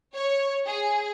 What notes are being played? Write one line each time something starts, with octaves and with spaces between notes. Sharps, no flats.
C#5
G#4